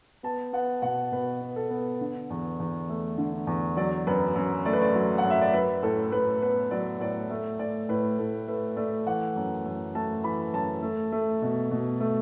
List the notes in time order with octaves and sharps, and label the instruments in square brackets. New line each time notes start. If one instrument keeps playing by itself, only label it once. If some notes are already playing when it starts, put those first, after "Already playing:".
[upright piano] B3 A5
B3 F#5
B2 F#5
B2 B4
B3
A4
B3
D3
E2
E2
A3
D3
E2
F#3 D5
F#2 B4
F#2
A3 D5
B4
D5
F#3
F#5
F#2
E5
D5
F#3 B4
A2 A4
A2 B4
B3 B4
F#3 D5
A2 D5
A3
A3 D5
A2 B4
A2 A4
A3 B4
A3 D5
E3 F#5
F#2
F#2
A3 A5
E3 B5
F#2 A5
A3
A3
B2
B2
A3